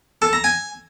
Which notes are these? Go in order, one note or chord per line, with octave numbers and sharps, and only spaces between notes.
A4
A#5
G#5